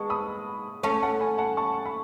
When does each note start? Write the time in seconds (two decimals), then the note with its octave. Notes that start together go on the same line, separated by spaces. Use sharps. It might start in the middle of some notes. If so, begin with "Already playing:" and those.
Already playing: G#3 B3 A5 C#6
0.10 B5 D#6
0.83 A3 C#4 A5 C#6
1.02 F#5 A5
1.20 G#5 B5
1.38 F#5 A5
1.57 A5 C#6
1.86 B5